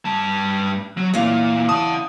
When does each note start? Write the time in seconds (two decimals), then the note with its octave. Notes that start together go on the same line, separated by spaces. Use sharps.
0.05 G2 A5
0.97 F#3
1.14 E2 A#2 F5
1.69 F#5 A5 D#6